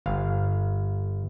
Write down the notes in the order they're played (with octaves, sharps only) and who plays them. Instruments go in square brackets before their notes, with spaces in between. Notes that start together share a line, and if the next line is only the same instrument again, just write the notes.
[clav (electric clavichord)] G1 F5